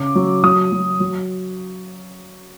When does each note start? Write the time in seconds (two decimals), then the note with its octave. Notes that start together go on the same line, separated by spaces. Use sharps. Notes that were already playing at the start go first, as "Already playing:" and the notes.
Already playing: C#3 D6
0.15 F#3
0.43 F#3 D#6
0.72 F#3
1.00 F#3